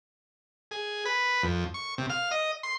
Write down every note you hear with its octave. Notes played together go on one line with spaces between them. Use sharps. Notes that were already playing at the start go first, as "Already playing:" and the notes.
G#4
B4
F2
C#6
C3
F5
D#5
C6